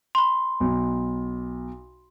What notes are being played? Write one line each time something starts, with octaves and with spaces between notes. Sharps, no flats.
B5 C6
B1